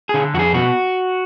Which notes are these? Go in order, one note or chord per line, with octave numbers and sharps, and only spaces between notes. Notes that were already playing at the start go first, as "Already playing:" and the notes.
D3 G#4
F2 F#4
G#4
B2 F#4